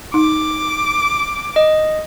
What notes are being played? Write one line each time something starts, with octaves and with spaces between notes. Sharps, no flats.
D#4 D6
D#5